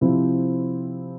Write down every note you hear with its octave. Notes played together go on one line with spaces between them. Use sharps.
C3 F3 C4 E4